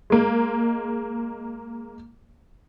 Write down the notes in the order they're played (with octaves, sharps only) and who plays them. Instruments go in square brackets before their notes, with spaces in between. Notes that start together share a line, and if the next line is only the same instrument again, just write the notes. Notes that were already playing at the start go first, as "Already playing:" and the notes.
[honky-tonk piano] G#3 A#3